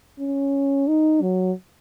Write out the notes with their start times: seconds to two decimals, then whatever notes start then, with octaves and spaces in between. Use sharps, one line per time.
0.19 C#4
0.88 D#4
1.22 F#3